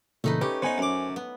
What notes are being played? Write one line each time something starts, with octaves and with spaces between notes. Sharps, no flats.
A#2 C#3 E3 A3 D#4 B4
C#4 G4 B4
B3 D#4 C5 G#5
F#2 D6
B3